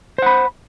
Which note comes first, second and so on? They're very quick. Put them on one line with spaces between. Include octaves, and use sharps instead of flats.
C5 F#5 B5